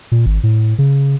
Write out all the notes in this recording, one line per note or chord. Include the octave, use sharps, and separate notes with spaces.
A#2
G#1
A2
C#3